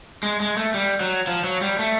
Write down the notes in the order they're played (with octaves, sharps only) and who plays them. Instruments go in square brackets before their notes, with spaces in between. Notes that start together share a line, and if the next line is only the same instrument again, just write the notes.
[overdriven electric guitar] G#3
G#3
A3
G3
F#3
F3
F#3
G3
A3